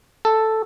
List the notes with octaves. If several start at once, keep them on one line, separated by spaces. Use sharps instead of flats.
A4